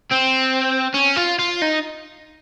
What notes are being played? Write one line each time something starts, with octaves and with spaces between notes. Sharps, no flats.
C4
C#4
F4
F4
D#4